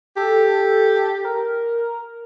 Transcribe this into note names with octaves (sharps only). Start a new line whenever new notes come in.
G4 A4
A#4